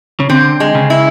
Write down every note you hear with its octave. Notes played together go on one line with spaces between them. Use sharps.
C#3
D3 C4
G#3
C#3
E4